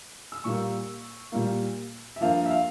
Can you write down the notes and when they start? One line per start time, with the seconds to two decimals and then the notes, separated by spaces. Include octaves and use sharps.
0.32 E6
0.44 A#2 G3 A#3 C#6
1.32 A#2 G3 A#3
2.16 E5
2.21 G2 F3 A#3 F5
2.46 E5
2.50 F5